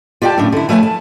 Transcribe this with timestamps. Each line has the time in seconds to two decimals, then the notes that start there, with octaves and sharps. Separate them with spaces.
0.22 F4 G4 D5 F#5 G5 A5
0.38 A2 C#3 D4
0.52 D3 E4
0.69 F3 A3 B4 C#5 G#5 A5
0.83 A5